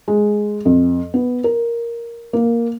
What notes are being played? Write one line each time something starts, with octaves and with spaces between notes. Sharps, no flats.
G#3
F2
B3
A#4
A#3